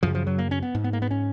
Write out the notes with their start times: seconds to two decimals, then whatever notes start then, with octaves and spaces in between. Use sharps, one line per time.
0.03 F#2 C#3 F3
0.15 F3
0.27 F#3
0.38 A#3
0.51 C#4
0.62 B3
0.75 G#2
0.84 B3
0.93 A#3
1.02 B3
1.11 C#4